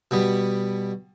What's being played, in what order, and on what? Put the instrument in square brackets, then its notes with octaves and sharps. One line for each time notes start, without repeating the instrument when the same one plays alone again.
[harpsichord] B2 G3 B3